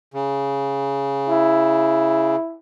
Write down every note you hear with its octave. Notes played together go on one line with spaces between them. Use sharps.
C#3
E4